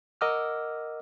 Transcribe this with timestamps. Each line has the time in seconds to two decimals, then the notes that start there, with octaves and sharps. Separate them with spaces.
0.21 A#4 D#5 F#5 D6 E6 F6